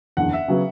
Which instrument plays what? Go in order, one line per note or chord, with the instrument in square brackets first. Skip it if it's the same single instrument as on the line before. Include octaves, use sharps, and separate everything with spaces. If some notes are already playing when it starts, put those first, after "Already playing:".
[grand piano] F#1 E2 D3 [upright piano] F#5
[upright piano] E5
[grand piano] C#3 F#3 B3